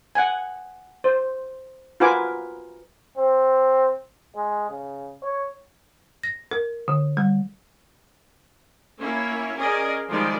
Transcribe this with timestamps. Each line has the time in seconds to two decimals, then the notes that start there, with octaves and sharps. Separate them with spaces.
0.15 F#5 G#5
1.04 C5
2.00 F4 F#4 A#4 B4 G#5 D6
3.18 C4
4.35 G#3
4.70 C#3
5.22 C#5
6.23 A#6
6.51 A#4
6.88 D3
7.17 G3
8.99 A#3 C#4 E4 C#5
9.56 C#4 G#4 A#4 D5 D#5
10.09 D#3 F3 G3 G#3 G4 D5